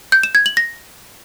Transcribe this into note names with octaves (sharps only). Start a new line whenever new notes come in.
G6
E7
G#6
F#7
A#6